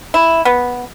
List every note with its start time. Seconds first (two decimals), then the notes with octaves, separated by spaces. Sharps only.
0.14 E4
0.45 B3